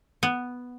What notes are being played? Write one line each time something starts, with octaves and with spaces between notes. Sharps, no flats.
B3